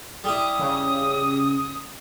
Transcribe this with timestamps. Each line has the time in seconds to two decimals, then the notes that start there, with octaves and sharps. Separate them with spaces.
0.24 G3 E4 D#6
0.59 C#3